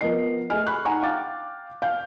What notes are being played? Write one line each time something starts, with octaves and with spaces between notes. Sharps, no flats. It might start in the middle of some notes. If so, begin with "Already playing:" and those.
F3 B3 A#4 D#5 C7
A3 G#4 D#5 G#5 F6
B5 C#6 F#6
D#4 F#5 G#5 A#5 C#6
F5 G5 D6 A6
F5 G6